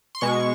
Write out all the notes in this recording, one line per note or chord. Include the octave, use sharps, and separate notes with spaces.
C6
B2 G#3 C#6